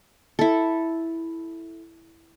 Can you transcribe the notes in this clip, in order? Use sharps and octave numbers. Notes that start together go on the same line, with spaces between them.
E4 A4